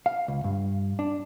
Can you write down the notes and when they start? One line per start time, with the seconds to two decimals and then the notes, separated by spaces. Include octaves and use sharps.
0.06 F5
0.28 C#2
0.44 G2
0.99 D4